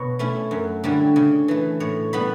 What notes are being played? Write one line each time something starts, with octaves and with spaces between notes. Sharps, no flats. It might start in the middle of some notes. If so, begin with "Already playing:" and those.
Already playing: B2 C#5
A3 C#4 E4
F#2
D3 G3 C#4 E4
C#3
E3 A3
A2 C#5
G3 B3 E4 B5